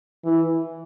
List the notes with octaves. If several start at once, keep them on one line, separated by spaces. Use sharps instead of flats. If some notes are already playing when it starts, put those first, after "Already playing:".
E3